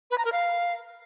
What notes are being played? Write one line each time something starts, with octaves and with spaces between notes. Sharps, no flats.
B4
A#5
A#4
F5